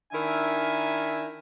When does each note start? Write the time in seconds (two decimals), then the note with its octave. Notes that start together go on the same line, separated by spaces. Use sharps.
0.12 D#3 D4 E4 A#4 E5 G#5